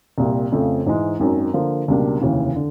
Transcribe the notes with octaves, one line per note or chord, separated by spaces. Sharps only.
C2 A#2 G3
F2 C#3 F3 A3
G#2 E3 G#3
G#1 F#2 D#3
D3 F3 A#3
C#2 B2 G3 A#3 D4
F1 D#2 C#3 E3
D3